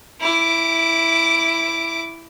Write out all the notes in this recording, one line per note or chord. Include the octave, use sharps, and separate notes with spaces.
E4 D6